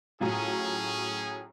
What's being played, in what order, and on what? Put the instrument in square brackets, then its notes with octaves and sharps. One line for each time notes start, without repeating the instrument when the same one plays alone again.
[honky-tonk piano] A2 F#3 F4 [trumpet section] C#4 G#4